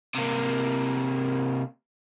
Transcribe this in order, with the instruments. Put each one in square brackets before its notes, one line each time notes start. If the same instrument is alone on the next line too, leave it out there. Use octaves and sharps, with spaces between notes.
[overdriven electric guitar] C3 A#3